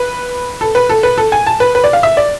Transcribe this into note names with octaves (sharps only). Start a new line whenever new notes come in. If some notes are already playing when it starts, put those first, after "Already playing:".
Already playing: B4
A4
B4
A4
B4
A4
G#5
A5
B4
B4
D5
F5
E5
D5